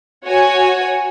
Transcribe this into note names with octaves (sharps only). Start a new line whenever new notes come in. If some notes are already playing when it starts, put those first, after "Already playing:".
F#4 C#5 G#5